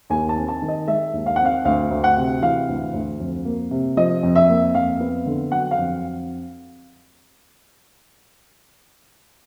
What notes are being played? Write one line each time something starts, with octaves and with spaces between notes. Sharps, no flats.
D#2 G#5
A5
C4
A5
D#3
D#5
G#3 E5
D#2
F5
C4 F#5
F5
D2 F5
D2
F#5
C3
E3 F5
D2
D2
F2
A#3
C3
F3 D#5
F2
E5
A#3
F2 F5
B3
D3
F#3 F#5
F5
F2